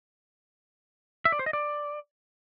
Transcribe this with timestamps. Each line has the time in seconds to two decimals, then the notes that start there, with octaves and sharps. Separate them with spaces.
1.25 E5
1.32 D5
1.39 C5
1.46 D#5
1.53 D5